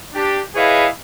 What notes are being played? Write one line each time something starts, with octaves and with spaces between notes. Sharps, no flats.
D4 G4
E4 G#4 B4 C#5 D#5 F5